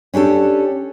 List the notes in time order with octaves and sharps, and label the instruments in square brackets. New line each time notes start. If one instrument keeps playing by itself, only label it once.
[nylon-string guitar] C#4 D4 G4 A4